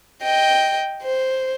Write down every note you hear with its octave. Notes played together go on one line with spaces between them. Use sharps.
D#5 G5
C5